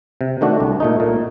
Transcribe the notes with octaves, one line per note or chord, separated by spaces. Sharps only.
C3
D#3 A3 D4 F#4
C2
A#2 A3 D#4
A#2